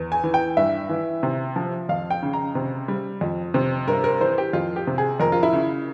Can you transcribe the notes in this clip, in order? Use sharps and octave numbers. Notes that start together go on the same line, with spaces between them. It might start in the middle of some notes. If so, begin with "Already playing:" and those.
Already playing: E2
G#5
E3
G5
G2 E5
E3
C3
F3
F2 F5
G5
C#3
A#5
C3
G3
F2
C3
G2 A#4
A#4
E3 C5
G4
F2 F4
G4
C3
G#4
F2 A#4
F4
E4
C#3